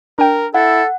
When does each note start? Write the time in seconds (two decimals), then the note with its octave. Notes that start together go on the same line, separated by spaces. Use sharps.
0.19 D4 A#4 G5
0.54 E4 A4 F#5